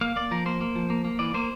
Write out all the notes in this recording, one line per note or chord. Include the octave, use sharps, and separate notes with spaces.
A#3 F5
A#3 D5
F3 A#4
A#3 C5
A#3
F3
A#3
A#3
E3 D5
A#3 C5